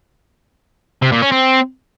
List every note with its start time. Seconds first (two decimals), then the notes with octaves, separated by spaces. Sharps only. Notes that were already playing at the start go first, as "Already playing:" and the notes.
1.02 C3
1.12 A#2
1.22 C#4
1.32 C4